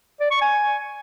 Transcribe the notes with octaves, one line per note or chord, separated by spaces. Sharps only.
D5
C#6
G#5